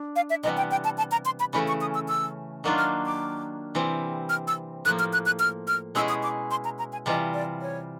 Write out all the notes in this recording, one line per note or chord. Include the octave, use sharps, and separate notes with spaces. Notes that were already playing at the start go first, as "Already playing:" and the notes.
Already playing: D4
F5
E5
C3 E3 G3 B3 D#5
G5
G5
A5
A5
A#5
C6
B5
C#3 E3 A3 C#4 B5
C#6
D#6
E6
E6
D#3 F#3 A#3 D4 F4
F6
D6
C3 E3 G3 C4
F6
E6
A2 F3 A#3 F#6
F6
F#6
F#6
F6
F6
B2 G#3 C#4 E4 G#4 E6
D#6
D6
C6
A#5
A#5
G#5
C3 E3 G3 C4 F4 D#5
D5
C#5